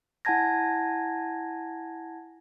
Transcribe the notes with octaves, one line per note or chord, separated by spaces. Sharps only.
E4 F#5 G#5 A5 G#6 A#6